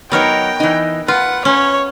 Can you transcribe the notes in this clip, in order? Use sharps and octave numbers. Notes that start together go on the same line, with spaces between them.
F#3 B3 D#4 A#4 C#5 G5
E3 D#4
F4 B4 F#5
C#4 C#5